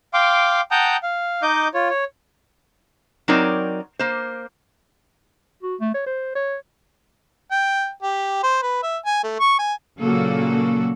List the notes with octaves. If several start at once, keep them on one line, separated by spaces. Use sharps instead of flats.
F5 G5 C6 D6
F#5 G5 A5 A#5 D#6 G6
F5
D#4 D#5 D6 G6
F4 C#5
C#5
F#3 C4 D#4 A#4 C#5 D5
A#3 C5
F#4
A3
C#5
C5
C#5
G5
G4
C5
B4
E5
G#5
A3
C#6
G#5
A#2 C#3 F#3 A#3 F#4 A4